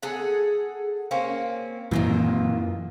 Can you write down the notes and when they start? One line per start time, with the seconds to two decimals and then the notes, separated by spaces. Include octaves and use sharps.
0.03 G#4 A4 F#5
1.11 A#3 C4 C#4
1.91 F#2 A#2 D#3 E3 A#3 F4